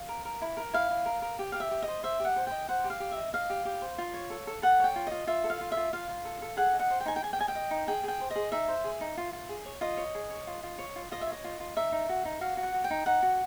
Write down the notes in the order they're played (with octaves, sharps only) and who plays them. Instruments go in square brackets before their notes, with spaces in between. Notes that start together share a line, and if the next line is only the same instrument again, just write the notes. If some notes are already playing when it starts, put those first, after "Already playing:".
Already playing: [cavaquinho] F5
A#4
A#4
E4
A#4
E4 F5
E4
A#4
A#4
G4
G4 F5
E5
G4
D#5
C5
C5 E5
G4 F#5
C5
D#5 G5
C5 F#5
G4
F5
G4
E5
D#5
D#5 F5
G4
G4
C5
F4
C#5
A4
A4
A4 F#5
C#5 G5
F4
F4 D#5
F4 E5
A4
F5
F4
E5
F4
F4 F5
F4
A4
A4
G#4 F#5
D#5
F#5
C5
G5
D#4 G#5
G5
G#4 G#5
G5
D#5 G#5
G5
D#5
D#4
G#4 G5
G#4 G5
C5
D#5
G#4
D#4 E5
C5
G#4
D#4
F4
F4
G#4
C#5
F4 D#5
C#5
G#4
C#5
F4
F4
C#5
F4
F4 D#5
E5
C#5 D#5
F4
F4
D#4 E5
D#4
F#4
D#4
F#4 F5
F#4
F#5
F#4
G5
D#4
D#4 F#5
F#4